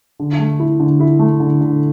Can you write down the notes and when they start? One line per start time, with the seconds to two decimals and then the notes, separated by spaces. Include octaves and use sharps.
0.19 D3
0.39 A3
0.60 E4
0.80 D3
1.00 E4
1.19 A3
1.40 D3
1.61 D3